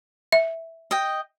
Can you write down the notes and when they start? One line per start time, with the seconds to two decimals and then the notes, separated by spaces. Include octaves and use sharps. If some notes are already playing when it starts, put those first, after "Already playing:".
0.32 E5
0.91 D#5 G5